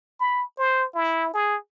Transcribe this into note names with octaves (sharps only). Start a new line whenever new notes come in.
B5
C5
E4
G#4